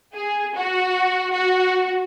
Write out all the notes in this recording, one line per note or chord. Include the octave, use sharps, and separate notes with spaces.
G#4
F#4
F#4